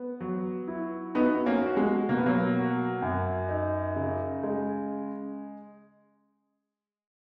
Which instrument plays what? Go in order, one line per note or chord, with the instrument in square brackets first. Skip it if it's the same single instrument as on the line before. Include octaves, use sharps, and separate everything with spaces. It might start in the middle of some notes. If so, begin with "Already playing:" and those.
Already playing: [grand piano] B3
F#3
E4
[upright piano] B3 D#4 [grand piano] F#4
[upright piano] A#3 C#4
[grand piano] F#4
[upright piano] G#3
[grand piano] B2 [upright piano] A#3
[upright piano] B3
F#3 A#3
[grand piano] F#4
F#2
D#4
C#3
G#3